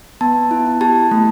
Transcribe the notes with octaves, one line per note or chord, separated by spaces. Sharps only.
B3 A5
E4
G4 A5
A3